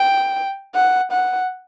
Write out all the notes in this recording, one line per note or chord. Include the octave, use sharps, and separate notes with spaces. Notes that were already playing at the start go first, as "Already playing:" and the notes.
Already playing: G5
F#5
F#5